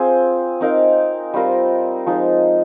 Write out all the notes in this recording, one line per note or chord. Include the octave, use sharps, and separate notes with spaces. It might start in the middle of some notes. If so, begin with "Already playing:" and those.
Already playing: C4 F4 G#4
C4 D#4 A#4 F5
G3 C4 F4 A#4
F3 G#3 D#4